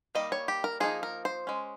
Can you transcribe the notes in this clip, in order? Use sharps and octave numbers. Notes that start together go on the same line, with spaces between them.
D#3 G3 A#3 D#5
C#5
G4
A#4
F3 A#3 D#4 G#4
A#4
C5
G#3 C#4